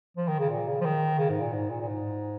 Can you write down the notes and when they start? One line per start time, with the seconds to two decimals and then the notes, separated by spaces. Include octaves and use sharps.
0.17 F3
0.28 D#3
0.39 C#3
0.49 A#2
0.67 C#3
0.81 F3
0.85 D#3
1.18 C#3
1.30 G#2
1.41 A#2
1.53 G#2
1.70 A#2
1.80 A#2
1.88 G#2